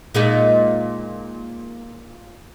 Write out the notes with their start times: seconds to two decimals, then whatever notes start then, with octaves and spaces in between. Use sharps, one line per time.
0.14 A#2 G#3 D#4